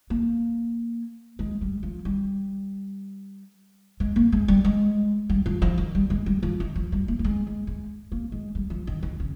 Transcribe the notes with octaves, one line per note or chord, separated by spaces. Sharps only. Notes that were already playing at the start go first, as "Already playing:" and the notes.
A#3
G#3
G3
F3
G3
G#3
A#3
G#3
G3
G#3
G3
F3
F3
D#3
G3
G#3
G3
F3
D#3
F3
G3
A#3
A#3
G#3
G#3
G#3
A#3
G#3
G3
F3
D#3
D#3
C#3